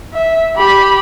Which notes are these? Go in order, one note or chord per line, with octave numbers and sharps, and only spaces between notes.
E5
G4 B5